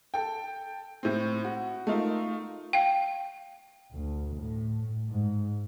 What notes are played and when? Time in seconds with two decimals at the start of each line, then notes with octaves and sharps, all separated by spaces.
0.14 A4 G5
1.03 A2 C4
1.44 F#4
1.87 A3 D#4 F4 A#4
2.73 F5 G5
3.93 D2
4.35 A2
5.08 G#2